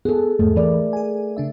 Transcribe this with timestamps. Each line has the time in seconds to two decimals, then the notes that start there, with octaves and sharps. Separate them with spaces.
0.05 B3 G#4 A4
0.39 E2 G#2 A3
0.56 E3 A#4 D5
0.93 G#4 G#5
1.37 C#3 D4 E5